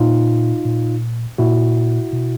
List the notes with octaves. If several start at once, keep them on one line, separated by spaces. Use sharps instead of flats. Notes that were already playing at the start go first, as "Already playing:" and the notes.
Already playing: A#2 D#4 F4
A#2
A#2 E4 F#4
B2